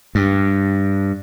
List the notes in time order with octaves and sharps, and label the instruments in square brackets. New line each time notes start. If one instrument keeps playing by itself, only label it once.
[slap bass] G2